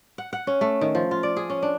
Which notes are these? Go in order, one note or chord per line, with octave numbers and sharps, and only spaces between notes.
F#5
F#5
C#4
A3
D#3
F3
F4
D5
G#4
C#4
D4